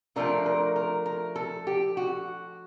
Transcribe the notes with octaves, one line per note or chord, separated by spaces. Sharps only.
F3 A3 D4 F4 A#4
A#4
A#4
A#4
A4
G4
F#4